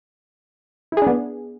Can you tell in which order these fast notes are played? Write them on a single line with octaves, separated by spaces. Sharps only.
E4 G#4 D4 B3